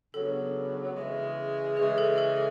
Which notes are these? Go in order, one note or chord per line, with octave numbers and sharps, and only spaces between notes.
C#3 F#3 B3 D4 A4
C#3 E3 G#3
C#3 E3 G#3 G#4
A4
A4